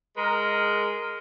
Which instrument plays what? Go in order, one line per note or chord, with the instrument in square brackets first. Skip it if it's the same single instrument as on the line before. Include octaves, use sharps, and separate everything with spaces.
[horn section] G#3 A#4